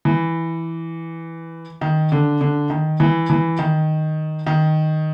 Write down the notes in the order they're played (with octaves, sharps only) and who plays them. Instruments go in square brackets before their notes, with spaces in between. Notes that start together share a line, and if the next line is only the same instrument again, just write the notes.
[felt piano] E3
D#3
D3
D3
D#3
E3
E3
D#3
D#3